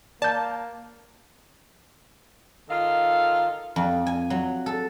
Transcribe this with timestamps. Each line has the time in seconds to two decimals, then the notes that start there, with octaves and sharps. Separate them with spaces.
0.22 A#3 D5 A5 G6
2.70 D#3 F4 A4 F5
3.76 F2
4.07 G#5
4.30 F#3
4.66 A4